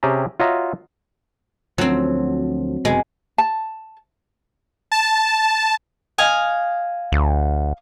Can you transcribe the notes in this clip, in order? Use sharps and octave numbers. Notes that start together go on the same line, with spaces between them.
C3 C#4 G4 G#4 A5 A#5
F4 F#4 C#5 D#5 E5 A#5
D2 F3 F#3 C4
F1 B2 G#3
A5
A5
D#5 F5 G#5
D2